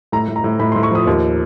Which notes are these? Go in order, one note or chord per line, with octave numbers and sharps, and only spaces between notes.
A2 A#5
A2
A#5
A2
A2 B5
C6
A2
C#6
F3 D#6
D#2